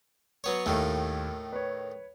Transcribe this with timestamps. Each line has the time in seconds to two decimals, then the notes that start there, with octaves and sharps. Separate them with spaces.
0.44 F#3 B3 C#5
0.66 D#2 A2 D#3 A3
1.53 B4 C#5